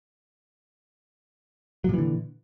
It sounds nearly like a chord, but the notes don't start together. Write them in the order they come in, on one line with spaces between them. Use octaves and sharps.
F#3 A#2 E3 D3